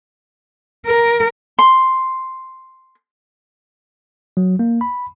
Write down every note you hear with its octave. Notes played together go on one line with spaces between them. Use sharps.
A#4
C6
F#3
A#3
B5